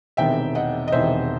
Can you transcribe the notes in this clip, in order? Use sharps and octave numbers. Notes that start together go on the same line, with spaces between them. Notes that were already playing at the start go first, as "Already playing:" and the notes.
E1 E2 C3 D#3 E5 G5
D#5 F#5
D#5
E1 E2 C3 D#3 C5 E5